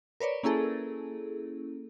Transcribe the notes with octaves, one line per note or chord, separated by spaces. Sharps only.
A#4 B4 C#5 D5
A#3 C#4 E4 G#4 A4